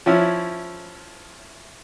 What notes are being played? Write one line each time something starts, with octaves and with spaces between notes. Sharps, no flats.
F3 C#4 E4